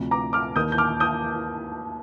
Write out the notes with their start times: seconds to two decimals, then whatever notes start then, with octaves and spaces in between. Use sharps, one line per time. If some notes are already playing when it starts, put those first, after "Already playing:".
Already playing: D2 C3 F3
0.11 A#5 D6
0.33 D6 F6
0.56 D#2 D#3 D#6 G6
0.72 G6
0.78 D6 F6
1.00 D#6 G6